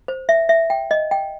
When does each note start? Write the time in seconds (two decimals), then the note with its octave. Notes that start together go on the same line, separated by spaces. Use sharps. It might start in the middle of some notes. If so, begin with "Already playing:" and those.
0.08 C5
0.29 E5
0.49 E5
0.70 G5
0.91 D#5
1.11 G5